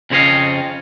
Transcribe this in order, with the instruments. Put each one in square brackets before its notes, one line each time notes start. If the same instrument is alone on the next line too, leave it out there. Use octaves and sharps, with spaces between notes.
[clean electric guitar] F2 C#3 C4 C#5 D#5 F5